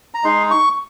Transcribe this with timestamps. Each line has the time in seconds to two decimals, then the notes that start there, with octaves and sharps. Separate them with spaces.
0.14 A#5
0.24 G#3 D#4 C6
0.51 C#6